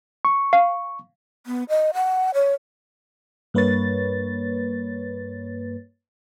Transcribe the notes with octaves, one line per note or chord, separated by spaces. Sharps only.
C#6
F5
B3
D#5
F#5
C#5
G2 A#3 B4 C#5 A6